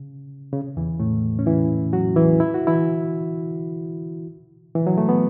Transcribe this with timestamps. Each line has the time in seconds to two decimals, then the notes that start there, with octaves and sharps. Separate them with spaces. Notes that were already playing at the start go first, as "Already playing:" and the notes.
Already playing: C#3
0.53 C#3
0.77 E2 E3
1.00 A2 A3
1.39 C#4
1.46 E3 E4
1.93 F#3 F#4
2.16 E3 E4
2.40 E4
2.54 F#4
2.67 E3 E4
4.75 E3
4.87 F#3
4.98 A3
5.09 B3